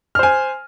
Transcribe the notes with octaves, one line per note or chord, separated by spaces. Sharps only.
C5 G#5 F6